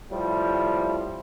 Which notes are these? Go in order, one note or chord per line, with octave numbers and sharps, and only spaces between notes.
A2 C3 F3 G3